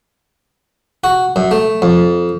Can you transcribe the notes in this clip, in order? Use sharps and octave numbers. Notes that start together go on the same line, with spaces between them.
F#4
F#2
A3
F2